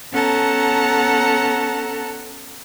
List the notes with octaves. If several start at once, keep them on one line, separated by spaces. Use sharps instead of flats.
B3 C#4 A4 F#5 A5 A#5